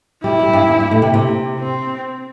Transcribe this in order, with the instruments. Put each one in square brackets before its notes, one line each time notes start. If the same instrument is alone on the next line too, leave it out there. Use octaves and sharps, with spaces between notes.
[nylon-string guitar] G3 [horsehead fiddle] E4
[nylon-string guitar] G3
G2
E2
G2
A2
C3
C3
[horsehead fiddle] C4